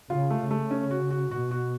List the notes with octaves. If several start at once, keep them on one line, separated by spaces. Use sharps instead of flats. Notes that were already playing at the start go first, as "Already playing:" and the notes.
C#3 F4
A3
C#3
A3
C#4
F#4
F#4
B2 F#4
F#4